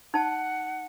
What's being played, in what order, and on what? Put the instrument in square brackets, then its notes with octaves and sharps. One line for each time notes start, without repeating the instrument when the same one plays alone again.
[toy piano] D#4 A5 [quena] F#5